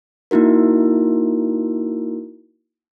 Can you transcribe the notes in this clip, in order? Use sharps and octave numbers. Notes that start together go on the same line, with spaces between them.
A#3 D#4 E4 F#4 A#4